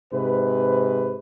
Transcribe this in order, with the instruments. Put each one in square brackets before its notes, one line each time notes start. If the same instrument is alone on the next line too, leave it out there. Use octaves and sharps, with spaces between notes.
[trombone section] G#2 C3 B4